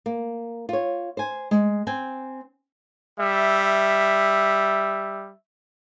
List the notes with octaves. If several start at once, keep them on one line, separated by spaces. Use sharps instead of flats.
A#3
F4 C#5
C5 G#5
G#3
C4 G5 G#5
G3 E5